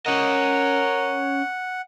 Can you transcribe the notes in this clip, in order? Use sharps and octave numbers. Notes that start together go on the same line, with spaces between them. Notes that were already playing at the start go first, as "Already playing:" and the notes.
C#4 A#4 D#5 F#5